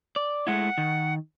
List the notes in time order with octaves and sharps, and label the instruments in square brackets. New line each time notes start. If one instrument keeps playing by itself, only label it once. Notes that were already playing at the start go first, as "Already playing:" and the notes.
[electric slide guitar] D5
[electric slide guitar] G#3 A3 E4 [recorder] F#5
[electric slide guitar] D#3